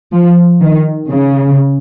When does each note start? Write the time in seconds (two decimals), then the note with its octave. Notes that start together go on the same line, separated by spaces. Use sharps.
0.13 F3
0.60 D#3
1.08 C#3